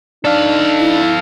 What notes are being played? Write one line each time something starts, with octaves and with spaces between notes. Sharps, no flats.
D4 D#4 A4 F5
E4